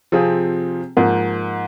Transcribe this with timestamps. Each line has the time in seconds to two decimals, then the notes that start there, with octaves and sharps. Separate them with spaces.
0.12 C3 F3 C4 F4 G#4
0.97 G#2 F3 A#3